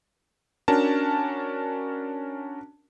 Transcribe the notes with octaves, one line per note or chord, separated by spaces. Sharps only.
C#4 D4 F#4 A#4 A5